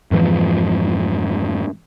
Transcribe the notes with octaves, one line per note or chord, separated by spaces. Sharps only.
F2 G#2 E3 F3